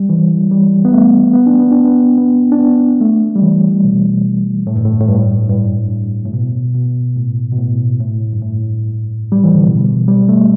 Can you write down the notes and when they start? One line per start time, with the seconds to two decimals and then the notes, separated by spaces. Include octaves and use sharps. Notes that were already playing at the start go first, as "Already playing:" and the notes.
Already playing: G3
0.09 E3
0.51 G3
0.85 B3
0.93 A3
1.33 B3
1.46 D4
1.59 B3
1.71 D4
1.84 B3
2.17 B3
2.52 D4
2.59 B3
3.00 A3
3.36 G3
3.42 E3
3.84 B2
4.67 A2
4.76 G2
4.85 A2
5.00 A2
5.09 G2
5.50 G2
6.25 A2
6.33 B2
6.75 B2
7.16 A2
7.52 B2
7.58 A2
8.00 A2
8.33 G2
8.42 A2
9.32 G3
9.44 E3
9.55 D3
9.66 B2
10.08 G3
10.28 A3